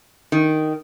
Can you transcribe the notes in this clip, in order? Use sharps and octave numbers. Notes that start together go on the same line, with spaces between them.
D#3